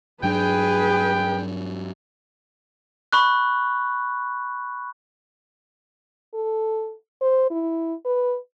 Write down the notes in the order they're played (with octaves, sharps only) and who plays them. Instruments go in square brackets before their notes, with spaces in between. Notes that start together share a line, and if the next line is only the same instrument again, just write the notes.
[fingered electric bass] G2 F#3 D4 [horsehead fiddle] G#4 B4 [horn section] G5
[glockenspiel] B5 C#6 F#6
[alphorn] A4
C5
E4
B4